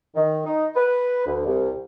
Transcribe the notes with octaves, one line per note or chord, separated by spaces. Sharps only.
D#3
D#4
B4
D2
C2